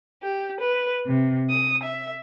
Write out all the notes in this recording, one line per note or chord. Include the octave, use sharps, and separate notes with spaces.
G4
B4
C3
D#6
E5